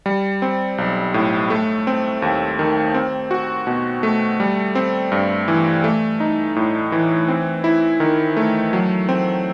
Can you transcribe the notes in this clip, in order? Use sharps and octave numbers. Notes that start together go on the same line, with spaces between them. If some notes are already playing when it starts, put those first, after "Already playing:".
G3
C4
B1
A2
A3
C4
D#2
D#3
C4
F#4
B2
A3
G3
C4
G2
E3
A3
D#4
A2
E3
C4
E4
D#3
A3
F#3
C4